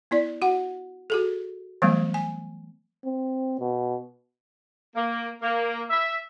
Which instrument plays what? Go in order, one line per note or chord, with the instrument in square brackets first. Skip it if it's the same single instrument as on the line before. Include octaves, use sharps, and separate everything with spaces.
[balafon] B3 E4 D5
F#4 F#5
F#4 G#4 A4
E3 F#3 G3 A3 B3
G#5
[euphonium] C4
B2
[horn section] A#3
A#3
E5